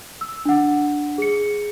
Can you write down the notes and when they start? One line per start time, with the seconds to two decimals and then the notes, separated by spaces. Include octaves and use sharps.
0.21 E6
0.45 D4 F#5
1.18 G#4 C#7